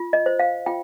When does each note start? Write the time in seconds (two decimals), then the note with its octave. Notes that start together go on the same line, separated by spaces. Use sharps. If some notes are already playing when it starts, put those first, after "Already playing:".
Already playing: F4
0.13 D#5
0.26 C5
0.39 F5
0.66 F4 G5